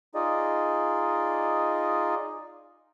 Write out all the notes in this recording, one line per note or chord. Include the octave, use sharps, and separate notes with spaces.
D#4 F4 G#4 D5 D#5